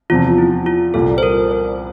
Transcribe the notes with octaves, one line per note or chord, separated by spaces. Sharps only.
E2 C3 F3 F4
E4
F4
C2 A#2 G3 A4
C5
A#4
C5